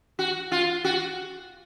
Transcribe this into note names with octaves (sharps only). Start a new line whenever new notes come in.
F#4
F4
F#4